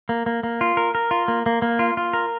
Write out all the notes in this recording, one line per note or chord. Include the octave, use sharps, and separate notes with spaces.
A#3
A#3
A#3
F4
A#4
A#4
F4
A#3
A#3
A#3
F4
F4
A#4